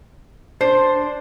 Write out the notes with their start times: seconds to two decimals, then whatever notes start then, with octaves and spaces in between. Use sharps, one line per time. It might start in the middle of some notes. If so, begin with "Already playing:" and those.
0.61 D4 C5